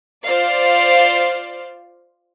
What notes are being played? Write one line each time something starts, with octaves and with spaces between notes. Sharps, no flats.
F4 C5 D5 F5